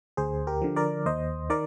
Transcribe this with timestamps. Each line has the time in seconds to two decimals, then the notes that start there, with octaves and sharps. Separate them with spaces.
0.17 D2 G#4 C5
0.47 G4 A#4
0.62 D3 F3
0.76 A#4 D5
1.06 D#2 C5 D#5
1.50 D#3 A#4 D5